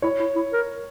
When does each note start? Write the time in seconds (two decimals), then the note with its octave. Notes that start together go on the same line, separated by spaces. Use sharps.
0.02 E4 C#5
0.20 E4
0.36 E4
0.53 A#4